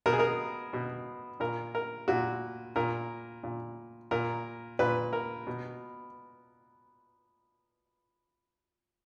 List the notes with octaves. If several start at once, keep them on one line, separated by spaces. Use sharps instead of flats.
B2 A#4
G#4
A#4
B2
A#2 A#4
A#4
A#2 F#4
A#2 A#4
A#2
A#2 A#4
A#2 B4
A#4
B2